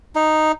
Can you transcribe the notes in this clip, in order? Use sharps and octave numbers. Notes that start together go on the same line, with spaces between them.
D#4